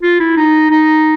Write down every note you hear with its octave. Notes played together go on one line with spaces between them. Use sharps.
F4
E4
D#4
D#4